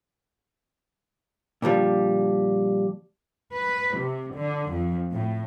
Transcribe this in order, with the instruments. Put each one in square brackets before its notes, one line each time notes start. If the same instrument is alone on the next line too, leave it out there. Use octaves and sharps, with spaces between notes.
[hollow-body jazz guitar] A#2 D3 F3 G3
[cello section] B4
C3
D3
F2
A2